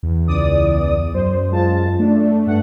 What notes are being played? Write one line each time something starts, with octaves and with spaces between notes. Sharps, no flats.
E2
C#2 D5 D#6
F#2 C5
G#3 F4 A5
A3 D4
G2 F#5